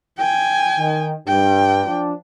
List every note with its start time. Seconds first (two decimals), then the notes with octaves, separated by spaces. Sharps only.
0.18 G5 G#5
0.78 D#3
1.28 G2 G5
1.86 F3 D4